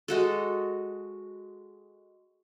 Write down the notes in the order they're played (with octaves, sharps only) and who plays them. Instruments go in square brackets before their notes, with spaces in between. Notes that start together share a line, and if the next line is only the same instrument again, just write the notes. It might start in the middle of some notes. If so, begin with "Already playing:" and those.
[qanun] G#3 F#4 A4